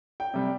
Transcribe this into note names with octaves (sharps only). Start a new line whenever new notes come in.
G5
C3 G3